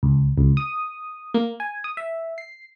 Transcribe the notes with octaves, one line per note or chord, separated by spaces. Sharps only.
C#2
C#2
D#6
A#3
G#5
D#6
E5
C7